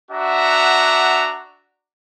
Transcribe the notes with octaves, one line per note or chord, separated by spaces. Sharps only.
D4 F#4 E5 F#5 A#5